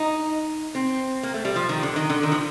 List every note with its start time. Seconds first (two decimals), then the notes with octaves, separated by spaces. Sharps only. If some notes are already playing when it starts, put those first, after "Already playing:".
Already playing: D#4
0.75 C4
1.23 A#3
1.34 A3
1.45 G3
1.56 F3
1.69 D#3
1.83 D3
1.96 D#3
2.10 D3
2.23 D#3
2.32 F3